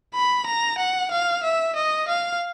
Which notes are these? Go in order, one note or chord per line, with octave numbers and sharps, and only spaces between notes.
B5
A#5
F#5
F5
E5
D#5
F5